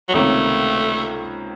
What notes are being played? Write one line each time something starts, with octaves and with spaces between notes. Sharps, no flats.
F#3
C#2 C3 D#3 A3 A#3 C#4